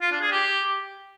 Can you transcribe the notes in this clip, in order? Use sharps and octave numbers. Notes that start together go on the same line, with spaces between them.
F4
D4
G#4
G4